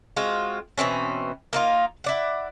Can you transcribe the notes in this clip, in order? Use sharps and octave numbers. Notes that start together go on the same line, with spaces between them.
G#3 C4 F4 F#4
B2 E3 C4 C#4
A#3 D#4 F4
E4 D5 F#5